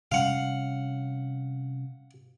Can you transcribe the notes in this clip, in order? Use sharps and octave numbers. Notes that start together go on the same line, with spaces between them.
C3 G3 C#4 F5 F#5